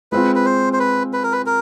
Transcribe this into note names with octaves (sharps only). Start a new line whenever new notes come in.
G#3 C4 F4 B4
B4
C5
C5
B4
B4
A#4
B4
A#4